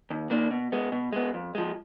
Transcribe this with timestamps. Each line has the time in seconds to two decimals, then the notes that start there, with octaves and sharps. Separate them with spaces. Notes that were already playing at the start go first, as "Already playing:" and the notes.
0.11 D#2
0.30 D#3 A#3 D4
0.51 B2
0.72 G#3 B3
0.92 B2
1.13 G#3 B3
1.34 F2
1.55 F3 G#3